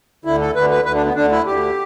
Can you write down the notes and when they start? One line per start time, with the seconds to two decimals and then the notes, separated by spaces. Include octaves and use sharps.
0.25 D2 D3 E4
0.41 A4
0.55 D2 D3 B4
0.71 B4
0.85 D2 D3 B4
0.95 D4
1.06 B3
1.15 D2 D3 D4
1.32 E4
1.46 D2 D3 G4